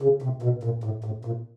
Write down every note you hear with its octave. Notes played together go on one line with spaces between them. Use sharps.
C#3
C3
B2
A#2
A2
A2
A#2